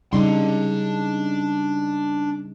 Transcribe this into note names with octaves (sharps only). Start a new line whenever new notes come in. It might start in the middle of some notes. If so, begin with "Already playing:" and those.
C#3 G3 D4 D#4 C6